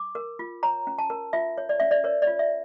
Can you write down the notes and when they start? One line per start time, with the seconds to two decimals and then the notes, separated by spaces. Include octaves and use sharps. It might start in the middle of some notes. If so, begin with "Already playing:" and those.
Already playing: D6
0.15 A#4
0.39 F4
0.63 C#5 A#5
0.87 C#4
0.99 A5
1.10 A#4
1.33 F4 E5
1.58 C#5
1.69 D5
1.80 C#4 E5
1.91 D5
2.04 A#4 C#5
2.22 D5
2.27 F4
2.39 E5